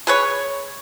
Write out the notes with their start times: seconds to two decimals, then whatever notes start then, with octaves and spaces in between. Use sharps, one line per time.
0.07 G#4 B4 C#5